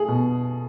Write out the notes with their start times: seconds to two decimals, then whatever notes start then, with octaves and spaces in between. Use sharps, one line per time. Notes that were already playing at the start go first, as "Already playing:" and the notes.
Already playing: A3 G#4
0.08 B2